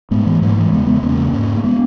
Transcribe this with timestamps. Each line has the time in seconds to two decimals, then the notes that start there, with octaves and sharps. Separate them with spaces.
0.11 G#2 G#3 B3
0.26 E3 G#3
0.42 G#2 F#3 A#3
0.57 E3 G#3
0.72 E2 C#3 G#3 B3
0.87 G#3 B3
1.03 E2 C#3 A#3 C#4
1.33 G#2
1.57 A#3
1.64 G#3 B3